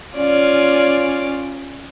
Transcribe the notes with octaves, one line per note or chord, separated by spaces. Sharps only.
C#4 F4 D5